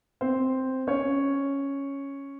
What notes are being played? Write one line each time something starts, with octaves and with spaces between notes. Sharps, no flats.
C4 C5
C#4 C#5